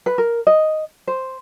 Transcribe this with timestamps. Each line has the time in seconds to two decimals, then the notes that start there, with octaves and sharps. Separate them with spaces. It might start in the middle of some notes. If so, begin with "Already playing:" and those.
0.06 B4
0.18 A#4
0.47 D#5
1.07 C5